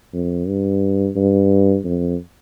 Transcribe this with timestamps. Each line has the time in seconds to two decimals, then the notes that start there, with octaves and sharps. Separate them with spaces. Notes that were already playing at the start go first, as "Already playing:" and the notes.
0.13 F2
0.48 G2
1.16 G2
1.85 F2